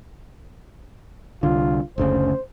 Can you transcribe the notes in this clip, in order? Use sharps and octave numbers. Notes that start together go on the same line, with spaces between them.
C2 D3 F4
F#1 D2 C#3 C5